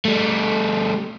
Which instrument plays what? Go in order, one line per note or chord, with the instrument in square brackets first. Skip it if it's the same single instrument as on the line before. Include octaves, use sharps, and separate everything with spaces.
[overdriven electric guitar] G3 A3